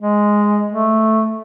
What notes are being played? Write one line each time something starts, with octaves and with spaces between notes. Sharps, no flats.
G#3
A3